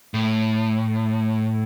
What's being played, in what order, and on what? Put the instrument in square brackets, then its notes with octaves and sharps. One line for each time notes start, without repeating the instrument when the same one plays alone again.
[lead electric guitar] A2